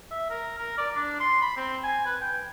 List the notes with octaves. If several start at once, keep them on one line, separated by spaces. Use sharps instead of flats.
E5
A#4
A#4
D5
D4
C6
B5
C4
G#5
B4
G5